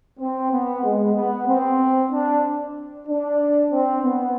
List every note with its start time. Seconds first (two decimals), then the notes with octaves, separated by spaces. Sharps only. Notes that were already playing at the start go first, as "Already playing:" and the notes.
0.20 C4
0.52 B3
0.83 G#3
1.15 B3
1.47 C4
2.11 D4
3.07 D4
3.71 C4
4.03 B3